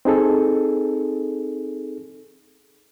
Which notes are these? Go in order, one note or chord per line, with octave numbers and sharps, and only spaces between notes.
C4 D#4 G#4 A4